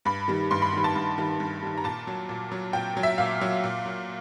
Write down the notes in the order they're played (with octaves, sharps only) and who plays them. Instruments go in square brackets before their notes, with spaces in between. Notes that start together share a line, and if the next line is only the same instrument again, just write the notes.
[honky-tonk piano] G2 B5
D#3 G3
G2 C6
B5
D#3 G3
A5
G2
D#3 G3
G2
D#3 G3
A#5
A#2 A5
F#3
A#2
F#3
A#2 G5
F#3
E5
A#2 F5
F#3
A#2
F#3